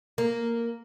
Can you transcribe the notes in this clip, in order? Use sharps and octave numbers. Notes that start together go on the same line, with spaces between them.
A#3